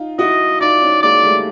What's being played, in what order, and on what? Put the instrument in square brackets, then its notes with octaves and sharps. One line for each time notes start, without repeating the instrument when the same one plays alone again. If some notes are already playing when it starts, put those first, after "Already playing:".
Already playing: [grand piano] D#4 F4
[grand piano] E4 F#4 [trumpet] D#5
[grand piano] D#4 F4 [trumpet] D5
[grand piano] C#4 D#4
[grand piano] G#3 A#3 [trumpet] D5
[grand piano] G3 A3